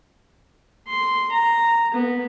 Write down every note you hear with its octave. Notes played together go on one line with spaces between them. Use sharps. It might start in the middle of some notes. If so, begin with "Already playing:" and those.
C6
A#5
B3